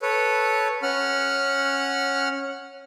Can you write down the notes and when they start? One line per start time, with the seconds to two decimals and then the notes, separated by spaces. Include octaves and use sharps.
0.02 A4 B4 C#5
0.83 C#4 F#5 F6